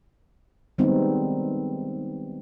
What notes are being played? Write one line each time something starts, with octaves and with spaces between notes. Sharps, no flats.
D#3 G3 G#3 B3 C4 D#4